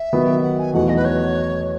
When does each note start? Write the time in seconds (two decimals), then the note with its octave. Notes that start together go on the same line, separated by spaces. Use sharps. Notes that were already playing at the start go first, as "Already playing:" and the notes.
Already playing: E5
0.13 D#3 F#3 B3
0.43 F#5
0.59 G#5
0.74 E2 B2 F#3 A3 D#4 F#5
0.89 D#5
0.97 B4
1.05 C#5